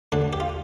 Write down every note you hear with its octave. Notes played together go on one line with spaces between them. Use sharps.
D2 D3 D4
G4
F4